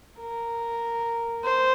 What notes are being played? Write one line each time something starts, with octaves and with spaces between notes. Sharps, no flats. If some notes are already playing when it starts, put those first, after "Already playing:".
A#4
C5